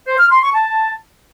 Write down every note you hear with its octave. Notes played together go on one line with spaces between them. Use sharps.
C5
F6
C6
C#6
A5